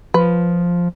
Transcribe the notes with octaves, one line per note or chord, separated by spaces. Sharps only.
F3 B4